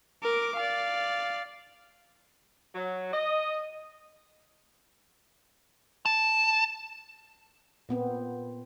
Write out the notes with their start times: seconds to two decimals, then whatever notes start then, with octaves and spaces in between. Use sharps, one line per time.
0.23 A#4 D6
0.56 D5 F5
2.75 F#3
3.13 D#5
6.06 A5
7.89 A#2 B3 C4